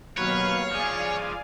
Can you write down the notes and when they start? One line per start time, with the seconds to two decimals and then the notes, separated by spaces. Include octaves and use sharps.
0.17 D#2 B2 F#3 B4 C#5 F5
0.72 F3 G#4 D5 G#5